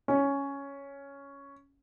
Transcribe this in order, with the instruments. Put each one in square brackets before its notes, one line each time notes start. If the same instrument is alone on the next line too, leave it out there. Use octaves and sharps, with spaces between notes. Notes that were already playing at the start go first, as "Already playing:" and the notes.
[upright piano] C#4